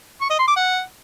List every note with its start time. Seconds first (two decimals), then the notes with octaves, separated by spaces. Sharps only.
0.21 C#6
0.30 D#5
0.39 C6
0.48 D6
0.57 F#5